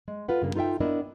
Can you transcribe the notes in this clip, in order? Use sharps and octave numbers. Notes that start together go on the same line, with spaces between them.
G#3
F4 A4 B4 F#5
G2 C#3 A#3
D#4 F4 A4 E5 G5
B3 D4 E4 A#4 D#5